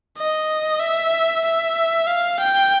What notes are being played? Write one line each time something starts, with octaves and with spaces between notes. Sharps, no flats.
D#5
E5
E5
F5
G5